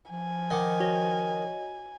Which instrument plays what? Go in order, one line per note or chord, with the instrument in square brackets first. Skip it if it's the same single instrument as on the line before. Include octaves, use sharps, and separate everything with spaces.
[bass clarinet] F3 [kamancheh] G#5
[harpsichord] D#3 [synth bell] D#5 F#5 D6
[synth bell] F#4 C#5 D#5